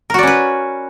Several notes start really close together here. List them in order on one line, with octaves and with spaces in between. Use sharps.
A#4 F#4 D5 C#4 B4